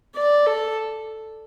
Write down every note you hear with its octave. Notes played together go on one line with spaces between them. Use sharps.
D5
A4